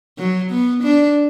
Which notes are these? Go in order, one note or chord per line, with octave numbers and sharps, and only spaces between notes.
F#3
B3
D4